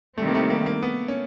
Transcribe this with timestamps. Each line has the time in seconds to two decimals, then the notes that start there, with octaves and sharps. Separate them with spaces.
0.18 C3 D#3 G3 A3 C4
0.28 A#3
0.35 A3
0.50 A#3
0.66 A#3
0.82 B3
1.08 C#4